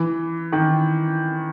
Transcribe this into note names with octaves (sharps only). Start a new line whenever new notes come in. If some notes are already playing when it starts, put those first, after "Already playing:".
Already playing: E3
D#3